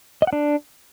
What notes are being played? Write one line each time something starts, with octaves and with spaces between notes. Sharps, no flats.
D#5
F#5
D4